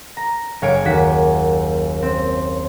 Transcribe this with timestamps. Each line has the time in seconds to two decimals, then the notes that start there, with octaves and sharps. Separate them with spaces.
0.17 A#5
0.62 F#1 C#5 F5 G#5 D7
0.85 D#2 F#4 B6
2.02 C4